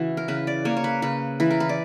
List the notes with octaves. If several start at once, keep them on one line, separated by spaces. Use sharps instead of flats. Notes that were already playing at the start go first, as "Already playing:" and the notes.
Already playing: C#3 E3 F#4
A#4
C#3 B4
D5
A#3 C#5
C#5
B4
C#3 B4
E3 B4
A#4
B4
D5